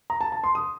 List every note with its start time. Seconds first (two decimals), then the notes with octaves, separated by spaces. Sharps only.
0.10 A#5
0.21 A5
0.32 A5
0.44 C6
0.55 D#6